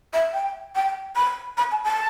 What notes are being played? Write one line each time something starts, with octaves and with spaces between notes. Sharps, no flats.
E5
G5
G5
B5
B5
A5
A5